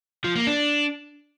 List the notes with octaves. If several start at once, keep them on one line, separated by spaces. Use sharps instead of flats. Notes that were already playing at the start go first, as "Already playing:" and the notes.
F3
A#3
D4